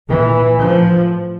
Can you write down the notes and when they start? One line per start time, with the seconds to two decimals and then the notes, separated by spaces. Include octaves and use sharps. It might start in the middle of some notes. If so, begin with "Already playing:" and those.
0.08 A#2 E3
0.60 A2 F3